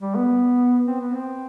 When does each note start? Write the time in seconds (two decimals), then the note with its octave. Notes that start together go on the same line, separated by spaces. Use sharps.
0.01 G3
0.15 B3
0.86 C4
1.00 B3
1.14 C4